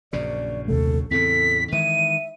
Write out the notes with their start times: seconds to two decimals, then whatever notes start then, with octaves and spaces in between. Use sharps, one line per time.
0.13 A#1 F#2 C#3 D5
0.68 D#2 C3 A3 A4
1.11 E2 A2 C#3 C4 A4 B6
1.72 D#3 E3 G#3 E5 D#7